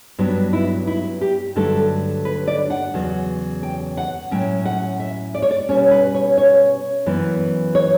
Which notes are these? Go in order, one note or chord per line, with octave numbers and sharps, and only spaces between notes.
G2 F#3 B3 D4
E4
E4
G4
G2 D3 F#3 A3 D4 A4
B4
D5
F#5
E2 C#3 F#3
G5
F#5
A2 F#3 C#4 G5
F#5
E5
D5
C#5
D5
B2 G3 C#4 C#5
B4
C#5
C#5
F#2 E3 B3
C#5